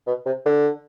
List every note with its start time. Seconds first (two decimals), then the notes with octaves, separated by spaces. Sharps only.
0.07 B2
0.26 C3
0.45 D3